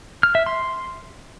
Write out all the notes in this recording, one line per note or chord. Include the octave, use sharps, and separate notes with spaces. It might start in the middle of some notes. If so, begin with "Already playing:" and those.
F6
E5
C6